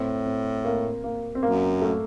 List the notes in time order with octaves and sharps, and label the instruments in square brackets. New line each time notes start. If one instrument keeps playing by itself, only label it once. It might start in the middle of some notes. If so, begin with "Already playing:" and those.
Already playing: [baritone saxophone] A2 [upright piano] C4
[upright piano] C4
A#3
A#3
C4
[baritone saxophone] F#2 [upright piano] A#3
[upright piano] A3